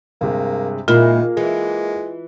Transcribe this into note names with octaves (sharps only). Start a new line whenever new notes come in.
G2 C3 G#3 A#3
A#2 D#3 G#3 A#3 E4 F4 G#4 A#4
E3 G#3